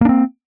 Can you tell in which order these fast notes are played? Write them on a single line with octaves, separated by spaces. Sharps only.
A#3 D4 C4